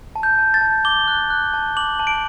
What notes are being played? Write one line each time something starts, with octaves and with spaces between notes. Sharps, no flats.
A5
G6
A5
A6
A5
D6 G7
F#6
F#6
A5
D6 F#7
A5
D7